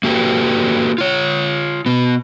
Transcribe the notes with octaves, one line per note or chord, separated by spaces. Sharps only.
A#3 F#4 G4 A4 B4
F4 C#5
B2 B3